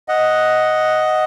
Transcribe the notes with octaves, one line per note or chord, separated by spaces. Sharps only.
D#5 F#5